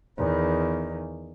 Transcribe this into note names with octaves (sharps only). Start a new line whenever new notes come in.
E2 D#3